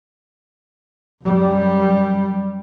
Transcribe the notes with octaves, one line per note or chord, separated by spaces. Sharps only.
F#2 G3